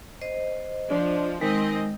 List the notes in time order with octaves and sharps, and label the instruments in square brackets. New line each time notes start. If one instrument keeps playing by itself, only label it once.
[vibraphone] C5 D#5
[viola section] F3 [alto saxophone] D4
[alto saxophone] D#3 [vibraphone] G#3 [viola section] C4 D#5